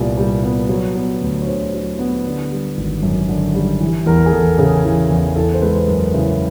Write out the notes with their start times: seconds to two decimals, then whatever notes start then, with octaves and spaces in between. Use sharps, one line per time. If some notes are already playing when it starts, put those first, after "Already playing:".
Already playing: C2 A#2 G3 B3 D5
0.17 G3
0.43 B3
0.69 F#3
0.95 B3
1.21 D2
1.42 C#5
1.47 D3 C5
1.73 F#3
1.99 B3
2.25 D3
2.51 G3
2.77 G#1
3.03 F#2
3.29 D3
3.54 G3
3.80 E3
4.06 E2 A#4
4.26 G#4
4.32 E2 A4
4.58 C#3 G#4
4.85 E3
5.11 E2
5.36 E3 A4
5.54 C5
5.62 G#3 B4
5.88 F#2 A#4
6.14 C#3 E4